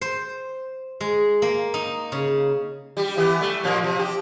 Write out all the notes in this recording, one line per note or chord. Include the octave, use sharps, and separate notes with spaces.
C5
G#3
A#3
D#4
C#3
G3 G4
E3 B3 G4
G3 A3
A#2 F3 A#3
C3 F3
G4